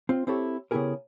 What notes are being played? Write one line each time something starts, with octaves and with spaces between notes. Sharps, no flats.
C4 F4
C4 E4 G4 A4 C#5
C#3 B3 E4 G4 G#4 A#4